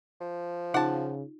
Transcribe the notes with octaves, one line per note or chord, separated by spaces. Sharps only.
F3
C#3 D#4 F4 F#5 A5